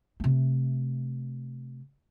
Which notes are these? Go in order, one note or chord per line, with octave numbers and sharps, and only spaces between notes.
C3 A3